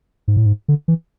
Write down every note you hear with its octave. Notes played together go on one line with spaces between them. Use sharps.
G#2
A2
G#2
D3
E3